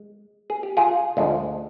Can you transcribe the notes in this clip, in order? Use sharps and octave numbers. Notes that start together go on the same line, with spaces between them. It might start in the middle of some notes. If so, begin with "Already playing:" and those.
Already playing: G#3
G#4
G4
F4 G#4
D2 D3 F3 G#3